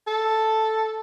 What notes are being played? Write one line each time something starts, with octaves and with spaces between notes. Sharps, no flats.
A4